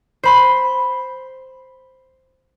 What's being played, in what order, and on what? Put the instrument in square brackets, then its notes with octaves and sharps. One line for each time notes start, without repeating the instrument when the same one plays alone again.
[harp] C5 B5 C6